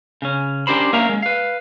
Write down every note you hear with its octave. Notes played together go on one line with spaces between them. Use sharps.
C#3 C#4
C#4 D4 G4 A#4 C5 B5
A#3 C#4 A#4 E5 F5 A#5
G#3
B4 F5